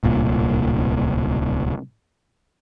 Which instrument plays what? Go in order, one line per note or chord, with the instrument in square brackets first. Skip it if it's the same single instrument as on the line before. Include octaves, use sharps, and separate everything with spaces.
[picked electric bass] D1 C2 A#2